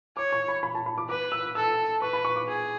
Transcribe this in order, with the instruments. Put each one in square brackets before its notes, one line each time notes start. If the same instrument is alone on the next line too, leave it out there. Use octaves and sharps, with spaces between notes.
[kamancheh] C#5 [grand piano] D6
[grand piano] C#6
B5
B5
A5
B5
D6
[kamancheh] B4 [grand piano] D6
[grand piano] E6
[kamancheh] A4 [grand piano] E6
[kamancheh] B4 [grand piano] C#6
[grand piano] B5
C#6
D6
[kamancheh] G#4